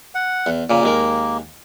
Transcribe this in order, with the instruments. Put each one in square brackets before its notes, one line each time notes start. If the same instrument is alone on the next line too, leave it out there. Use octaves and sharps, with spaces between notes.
[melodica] F#5
[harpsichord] E2
[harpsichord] A#2 C#3 [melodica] A#3
[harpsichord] D#2 G#3 A#4